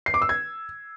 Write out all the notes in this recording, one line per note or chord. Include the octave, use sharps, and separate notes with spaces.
C7
D6
E6
G#6